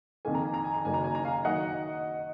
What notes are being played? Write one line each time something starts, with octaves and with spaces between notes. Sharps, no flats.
F2 D#3 A#3 G#5
A#5
G#5
A#5
G#5
A#5
F#1 F#2 D#3 A#3 G#5
A#5
G#5
A#5
F5 G#5
G#5
D#3 F#3 A#3 D#5 F#5